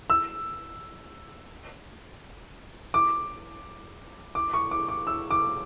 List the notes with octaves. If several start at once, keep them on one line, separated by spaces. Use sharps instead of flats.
E6
D6
D6
C#6
D6
D6
E6
D6